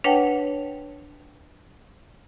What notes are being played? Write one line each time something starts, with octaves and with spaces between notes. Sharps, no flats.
D4 B4 C#5 F#5 G5 A5